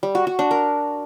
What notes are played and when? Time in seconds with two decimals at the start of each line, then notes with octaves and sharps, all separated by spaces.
0.03 G3
0.15 F#4
0.27 F#4
0.39 D4
0.51 A#4